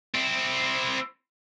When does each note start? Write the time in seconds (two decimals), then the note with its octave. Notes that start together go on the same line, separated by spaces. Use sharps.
0.14 C4 E4